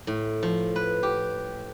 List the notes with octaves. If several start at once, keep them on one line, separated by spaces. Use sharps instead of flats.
A2
F3
B4
G4